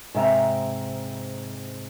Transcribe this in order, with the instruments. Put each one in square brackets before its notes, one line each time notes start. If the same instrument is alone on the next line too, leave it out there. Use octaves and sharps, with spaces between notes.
[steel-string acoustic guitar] G#2 C3 E5 G5 A#5